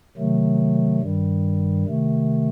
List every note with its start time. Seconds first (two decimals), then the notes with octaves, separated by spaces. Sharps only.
0.17 C3 D#3 F#3 A3
1.00 G2 D#3 G3
1.86 C3 D#3 A3